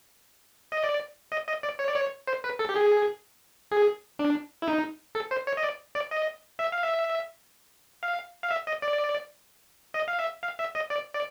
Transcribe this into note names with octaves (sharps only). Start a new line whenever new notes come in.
D#5
D5
D#5
D#5
D5
C#5
D5
C#5
C5
B4
A4
G4
G#4
G#4
D4
E4
D#4
A4
C5
C#5
D#5
D5
D5
D#5
E5
F5
E5
F5
F5
E5
D#5
D5
D#5
F5
E5
F5
E5
D#5
D5
D5